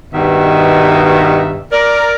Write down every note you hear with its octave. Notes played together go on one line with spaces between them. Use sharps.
G2 B2 D#3 E5
A#4 D5